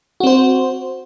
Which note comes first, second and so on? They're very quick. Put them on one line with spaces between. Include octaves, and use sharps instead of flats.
F#4 C4 C5